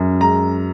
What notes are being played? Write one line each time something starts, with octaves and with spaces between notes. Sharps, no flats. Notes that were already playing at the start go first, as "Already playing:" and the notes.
Already playing: F#2
G#3 A#5